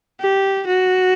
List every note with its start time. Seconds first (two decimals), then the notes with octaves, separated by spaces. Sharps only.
0.20 G4
0.67 F#4